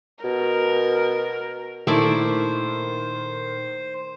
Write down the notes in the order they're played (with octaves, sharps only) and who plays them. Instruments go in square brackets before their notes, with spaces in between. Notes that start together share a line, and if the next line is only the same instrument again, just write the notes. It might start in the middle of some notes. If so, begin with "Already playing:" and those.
[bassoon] B2 [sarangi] A#4
[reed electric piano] A#2 [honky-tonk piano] D#3 [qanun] A3 E4 D5 [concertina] C5